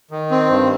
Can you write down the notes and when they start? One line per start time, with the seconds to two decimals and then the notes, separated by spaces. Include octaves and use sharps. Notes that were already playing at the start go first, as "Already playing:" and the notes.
0.11 D#3
0.31 C4
0.50 G2